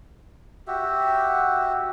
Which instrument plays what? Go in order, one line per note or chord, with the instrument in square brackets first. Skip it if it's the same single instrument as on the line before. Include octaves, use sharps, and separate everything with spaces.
[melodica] F#4 G4 E5